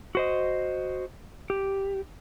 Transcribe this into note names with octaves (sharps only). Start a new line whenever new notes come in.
F#4 C5 D#5
G4